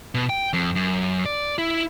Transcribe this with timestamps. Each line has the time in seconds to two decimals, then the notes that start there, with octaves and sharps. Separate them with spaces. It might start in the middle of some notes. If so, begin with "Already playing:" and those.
0.15 B2
0.29 G5
0.53 F2
0.76 F#2
1.26 D5
1.58 E4